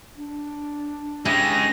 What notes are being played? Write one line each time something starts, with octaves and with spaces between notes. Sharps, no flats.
D4
G#3 C#4 E4 G4 G#4 A#6